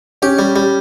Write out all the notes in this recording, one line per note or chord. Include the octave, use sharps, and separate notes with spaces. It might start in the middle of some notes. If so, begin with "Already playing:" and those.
C#4 G4
G3
G3